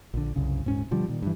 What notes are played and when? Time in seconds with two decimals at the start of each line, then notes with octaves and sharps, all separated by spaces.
0.14 A#1 D3
0.36 C2 F#2 C#3
0.64 D#1 G#2 C#4
0.91 B2 D3 F3 G3
1.08 A#2 D#3
1.22 G2 E3